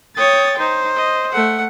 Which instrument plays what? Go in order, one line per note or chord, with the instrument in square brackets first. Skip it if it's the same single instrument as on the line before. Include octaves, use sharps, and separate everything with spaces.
[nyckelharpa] C#5 G5 [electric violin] D#6 A6
[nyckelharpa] D#4 [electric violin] C5
[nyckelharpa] D#5
A3 F#5